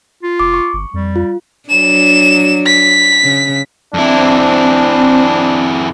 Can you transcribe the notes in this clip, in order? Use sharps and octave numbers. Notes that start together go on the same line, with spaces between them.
F4
F1 D6
C#6
G1
F2 G3
F4
F#3 D4 E7
B6
C#3
F2 C4 D4 E4